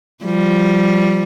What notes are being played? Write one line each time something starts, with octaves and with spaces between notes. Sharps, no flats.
F3 G3